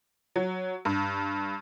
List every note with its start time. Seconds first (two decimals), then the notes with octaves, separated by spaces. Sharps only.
0.36 F#3
0.85 G2